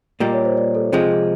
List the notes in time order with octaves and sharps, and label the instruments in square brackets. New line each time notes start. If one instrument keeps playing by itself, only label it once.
[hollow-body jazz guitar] A#2 G3 A#3 [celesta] D#5
[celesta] C#5
C5
D5
A4
[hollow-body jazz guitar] C3 F3 G#3 [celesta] G#4
[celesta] G#4